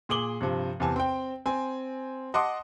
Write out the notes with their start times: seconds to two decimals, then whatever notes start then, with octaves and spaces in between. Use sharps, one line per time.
0.09 A#2 G#4 D6 F#7 G7
0.41 G2 C3 F3
0.80 E2 C3 G#5 A5
0.96 C4 G5
1.46 C4 G#5
2.34 D#5 F#5 A5 C6 D6 D#6